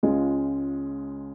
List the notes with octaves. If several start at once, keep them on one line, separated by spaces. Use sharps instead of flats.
C#2 C#3 G#3 F4